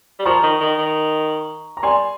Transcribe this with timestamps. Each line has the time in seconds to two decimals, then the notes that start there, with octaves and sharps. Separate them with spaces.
0.19 G3
0.26 F3 A#5 C#6
0.43 D#3
0.60 D#3
0.78 D#3
1.77 A#5
1.83 G3 G#5 C6